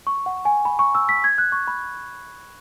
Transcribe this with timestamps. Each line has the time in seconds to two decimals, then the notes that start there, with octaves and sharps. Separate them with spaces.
0.07 C#6
0.26 F#5
0.45 G#5
0.65 B5
0.79 C#6
0.95 E6
1.09 B6
1.24 G#6
1.38 F#6
1.52 C#6
1.68 B5